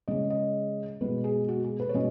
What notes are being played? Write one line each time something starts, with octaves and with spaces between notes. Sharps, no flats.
C#3 G#3 C#4 D#5
D#5
B2 G#3 B3 B4
G#4
F#4
G#4
B4
C#5
B2 G#3 C#4 D#5